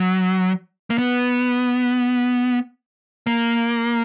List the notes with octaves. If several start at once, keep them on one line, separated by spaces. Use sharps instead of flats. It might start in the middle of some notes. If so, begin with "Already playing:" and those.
Already playing: F#3
A#3
B3
A#3